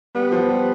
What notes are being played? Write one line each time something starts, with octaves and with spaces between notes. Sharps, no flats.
G3 B3
F3
G3